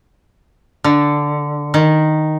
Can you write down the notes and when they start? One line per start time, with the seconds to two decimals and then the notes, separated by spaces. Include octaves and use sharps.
0.84 D3
1.74 D#3